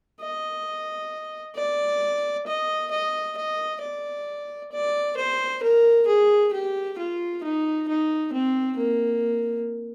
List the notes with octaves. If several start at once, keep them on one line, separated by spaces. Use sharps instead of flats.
D#5
D5
D#5
D#5
D#5
D5
D5
C5
A#4
G#4
G4
F4
D#4
D#4
C4
A#3